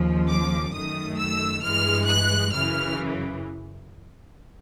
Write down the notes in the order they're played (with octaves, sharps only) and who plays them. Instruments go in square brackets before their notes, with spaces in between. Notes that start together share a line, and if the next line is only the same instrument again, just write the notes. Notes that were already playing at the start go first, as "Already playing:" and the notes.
Already playing: [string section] D#2 C#3 F3
D6
F#2 D#3 F#3 A3 D#6
E6
G2 E3 G#3 F6
F#6
F#2 C#3 E3 F6